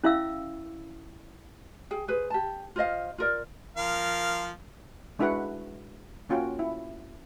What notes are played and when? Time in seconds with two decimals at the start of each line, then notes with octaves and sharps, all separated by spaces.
0.04 C#4 E4 E5 F5 E6
1.91 G#4 G5
2.08 G#4 B4 C5
2.30 G4 A5
2.76 F4 C5 D#5 F5
3.18 F4 A#4 D5
3.77 F3 A#4 F5
5.19 G#3 D4 E4 F#4 B4 F#5
6.29 A#3 C#4 F4 F#4 G5
6.59 E4